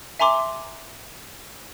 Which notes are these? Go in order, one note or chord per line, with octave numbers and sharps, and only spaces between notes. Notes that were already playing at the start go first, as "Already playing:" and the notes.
E5 G#5 A#5 C6 D6